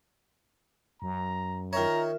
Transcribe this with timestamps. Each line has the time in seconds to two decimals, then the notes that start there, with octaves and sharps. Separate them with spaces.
1.02 F#2 A#5
1.73 D#3 F4 A#4 C#5 E5 A#5